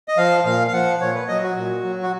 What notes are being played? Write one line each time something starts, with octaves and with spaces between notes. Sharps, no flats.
D#5
F3 F5
A#2 F5
F5
F3 F#5
A#2 C#5
B4
F#3 D#5
F#4
A#2
F#3
F#4